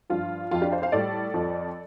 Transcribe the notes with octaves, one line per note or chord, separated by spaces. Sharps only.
G2 F3 F4
F2 F3 F4
D4 G4
C5 F5
C5 F5
A2 G3 A4 D5
F2 F3